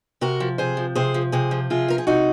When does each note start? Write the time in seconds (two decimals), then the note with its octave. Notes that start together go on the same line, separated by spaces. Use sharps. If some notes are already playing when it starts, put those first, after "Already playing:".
0.21 C3 F#4 A#4
0.40 F3
0.58 C3 G#4 C5
0.77 F3
0.95 C3 G#4 C5
1.14 F3
1.32 C3 G#4 C5
1.51 F3
1.70 C3 F4 G#4
1.88 F3 A#4
1.98 G#4
2.07 C3 D#4 F#4